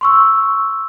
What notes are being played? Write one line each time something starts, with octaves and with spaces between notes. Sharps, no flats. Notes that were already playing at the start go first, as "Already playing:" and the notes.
C6 C#6 E6